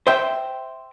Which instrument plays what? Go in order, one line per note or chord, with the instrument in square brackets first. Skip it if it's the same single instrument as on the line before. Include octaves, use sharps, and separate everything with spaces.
[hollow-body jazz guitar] C5 E5 G5